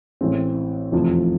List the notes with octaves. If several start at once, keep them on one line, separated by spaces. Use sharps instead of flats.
A1 A2 E3 G#3 C4
F1 E2 C3 F3